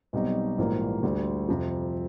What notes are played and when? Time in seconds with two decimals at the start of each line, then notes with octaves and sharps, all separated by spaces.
0.13 B1 B2 G3 C4 D#4
0.58 A#1 G#2 E3 G3 A#3
1.03 D2 D3 G3
1.49 F2 C3 F3